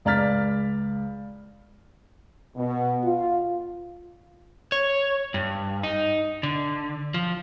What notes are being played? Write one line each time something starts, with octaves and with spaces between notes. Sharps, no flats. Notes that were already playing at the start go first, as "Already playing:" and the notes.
C#2 D5 A#5 F6 A6 B6
B2
F4
C#5
G2
D#4
D3
F3